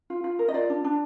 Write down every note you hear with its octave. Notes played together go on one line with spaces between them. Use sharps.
F4
F4
A#4
D#5
F4 D5
D4
D4